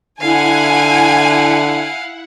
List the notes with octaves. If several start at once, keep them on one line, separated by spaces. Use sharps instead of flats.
D3 E4 F5 F#5 G#5